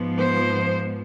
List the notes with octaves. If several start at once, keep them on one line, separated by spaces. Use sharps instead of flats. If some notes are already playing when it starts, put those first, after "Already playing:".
Already playing: G#2 F3 G#3 B3
C5